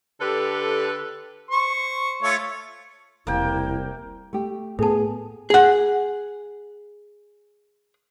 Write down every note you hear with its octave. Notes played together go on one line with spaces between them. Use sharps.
D3 G4 A4 B4
C5 C#6
A3 F4 C#5
E1 C2 A#3 E4 G5
A3 G4
A2 B3 G#4 A4 A5
G#4 F#5